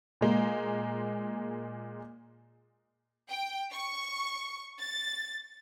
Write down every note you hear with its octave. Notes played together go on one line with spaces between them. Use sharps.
A#2 G#3 A#3
G5
C#6
A6